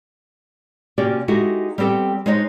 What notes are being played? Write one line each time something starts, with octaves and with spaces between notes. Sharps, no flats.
C3 A#3 C#4 F#4 G4 D5
G#3 D#4 E4 F#4 G4 A4
G3 B3 C4 G4 A4
G#3 D4 D#4 C5 C#5 D#5